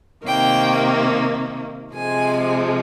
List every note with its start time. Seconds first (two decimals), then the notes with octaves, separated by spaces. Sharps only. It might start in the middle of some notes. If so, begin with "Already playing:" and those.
0.25 C3 D#3 A#3 G5
1.94 C3 F3 G#3 G#5